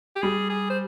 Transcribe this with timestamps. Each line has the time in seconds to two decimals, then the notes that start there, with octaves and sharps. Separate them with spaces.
0.16 G4
0.22 G3 G#4
0.50 G#4
0.70 C5